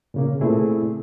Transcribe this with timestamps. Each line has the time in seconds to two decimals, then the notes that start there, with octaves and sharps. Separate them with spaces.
0.14 A#2 C#3 A#3
0.41 A#2 A3 C4 E4 G#4